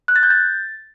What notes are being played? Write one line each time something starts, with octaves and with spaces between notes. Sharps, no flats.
F#6
A6
G6
A6